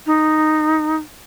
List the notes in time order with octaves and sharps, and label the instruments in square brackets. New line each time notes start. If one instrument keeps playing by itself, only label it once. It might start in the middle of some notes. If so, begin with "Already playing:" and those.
[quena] D#4